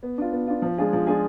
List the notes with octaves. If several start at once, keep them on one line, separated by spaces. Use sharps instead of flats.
B3
D4 F4
B3
D4 F4
F3
G#3 D4 F4 G#4
F3
G#3 D4 F4 G#4